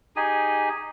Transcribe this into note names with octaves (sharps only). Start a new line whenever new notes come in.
D#4 G4 G#4 G#5